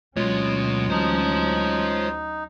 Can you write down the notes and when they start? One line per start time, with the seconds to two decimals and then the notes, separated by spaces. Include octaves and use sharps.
0.17 D2 B2 F#3 G#3 C#4 F4 C#5
0.90 D#4 C5 A5